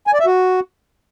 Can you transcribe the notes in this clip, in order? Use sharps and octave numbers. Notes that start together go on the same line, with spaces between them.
G#5
D5
E5
F#4